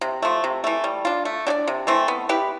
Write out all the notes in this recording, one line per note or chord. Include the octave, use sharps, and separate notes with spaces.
C3
F3 A3
C3
E3 A3
G3
D4 F4
A3
D4 G4 D5
C3
E3 A3 C4
B3
E4 G4 B4